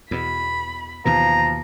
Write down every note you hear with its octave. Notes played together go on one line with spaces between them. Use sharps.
E2 B2 B5
D#2 B2 E3 F3 A#5